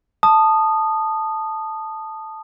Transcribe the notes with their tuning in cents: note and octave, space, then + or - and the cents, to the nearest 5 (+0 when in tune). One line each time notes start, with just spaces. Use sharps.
A5 +0 D#6 -15